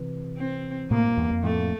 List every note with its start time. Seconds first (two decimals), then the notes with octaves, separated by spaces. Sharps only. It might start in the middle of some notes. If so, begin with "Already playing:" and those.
Already playing: C3 E3
0.38 C4
0.91 A2 C3 A#3
1.04 G2 A#2
1.17 E2 G2
1.31 F2
1.43 F2 A2 A3